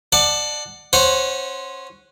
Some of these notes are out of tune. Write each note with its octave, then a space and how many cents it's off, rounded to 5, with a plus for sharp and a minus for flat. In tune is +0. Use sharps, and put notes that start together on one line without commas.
D5 +25 F#5 +0 A5 +0
C#4 -15 C5 +0 F#5 -5